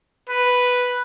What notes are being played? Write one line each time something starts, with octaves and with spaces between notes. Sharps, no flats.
B4